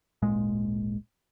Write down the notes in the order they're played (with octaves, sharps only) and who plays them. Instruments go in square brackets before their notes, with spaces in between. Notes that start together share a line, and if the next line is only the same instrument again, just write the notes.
[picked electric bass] D1 G#1 A#2 G#3